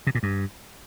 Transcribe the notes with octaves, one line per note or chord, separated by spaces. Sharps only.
C3
A#2
G2